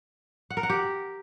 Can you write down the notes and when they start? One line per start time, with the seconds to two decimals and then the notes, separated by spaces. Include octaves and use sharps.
0.50 F#5
0.57 A#4
0.63 F#5
0.70 G4